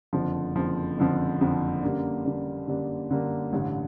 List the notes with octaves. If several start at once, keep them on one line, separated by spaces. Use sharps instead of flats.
F#1 F2 D3 F3
F#1 F2 D3 F3
F#1 F2 D3 F3
F#1 F2 D3 F3
F#2 D3 G3 A#3 D4
F#2 D3 G3 A#3 D4
F#2 D3 G3 A#3 D4
F#2 D3 G3 A#3 D4
A1 G2 D3